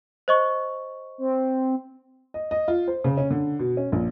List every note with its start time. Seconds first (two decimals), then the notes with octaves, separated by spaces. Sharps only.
0.28 C5 D#5 C#6
1.18 C4
2.34 D#5
2.51 D#5
2.68 F4
2.88 C5
3.04 C#3
3.17 C#4
3.31 D3
3.59 B2
3.77 C#4
3.92 A#1